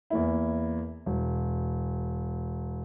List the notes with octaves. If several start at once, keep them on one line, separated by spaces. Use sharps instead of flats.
E2 A#3 E4
E1